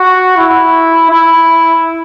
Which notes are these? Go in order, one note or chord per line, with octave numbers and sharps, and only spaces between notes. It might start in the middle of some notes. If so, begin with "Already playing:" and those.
Already playing: F#4
E4
E4